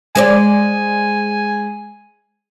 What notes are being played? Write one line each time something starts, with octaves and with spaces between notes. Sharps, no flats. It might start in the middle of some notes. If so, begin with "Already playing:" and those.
G#3 C5 D5 G#5